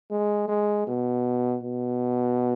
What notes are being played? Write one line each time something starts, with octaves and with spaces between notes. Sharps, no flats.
G#3
G#3
B2
B2